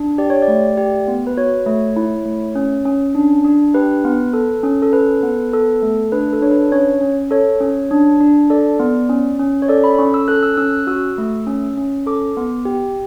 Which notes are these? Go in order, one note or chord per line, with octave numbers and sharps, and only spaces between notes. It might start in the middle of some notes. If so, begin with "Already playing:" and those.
Already playing: D4
G4 D5
C#5
D5
A3
G4
B3
B4
F#4 C#5
A3
E4
A3
C#4
C#4
D4
D4
G4 B4
B3
A4
C#4
A4
A4 B4
B3
A4
A3
D4 B4
A4
D4 C#5
B4
C#4 C#5
C#4
A4 C#5
C#4
D4
D4
A4 D5
B3
C#4
C#4
C#5
A4 D5
B5
C#4 C#6
E6
A4 F#6
E6
F#6
C#4 E6
F#6
F#4 E6
A3
C#4
C#4
A4 D6
B3
G4